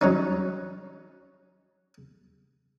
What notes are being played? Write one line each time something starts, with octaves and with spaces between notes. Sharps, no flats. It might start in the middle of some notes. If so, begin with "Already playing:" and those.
F#3 C#4 D#4